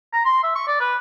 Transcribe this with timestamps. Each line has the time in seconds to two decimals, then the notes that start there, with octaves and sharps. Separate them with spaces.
0.13 A#5
0.25 C6
0.43 E5
0.55 C#6
0.67 D5
0.81 B4